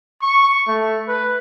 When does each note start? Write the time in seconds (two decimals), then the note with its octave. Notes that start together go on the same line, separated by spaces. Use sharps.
0.22 C#6
0.68 A3
1.08 B4